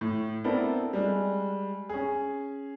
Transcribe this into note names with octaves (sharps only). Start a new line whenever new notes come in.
A2
B3 C4 D4 E4 A4 A#4
G3 G#3
C#4 G#4